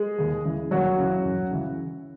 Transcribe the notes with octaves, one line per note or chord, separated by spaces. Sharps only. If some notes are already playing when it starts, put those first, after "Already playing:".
Already playing: G#3 G#4
D#2
C#3 E3
D#2 F#3 F#4
C#3 E3
F#2
C#3 E3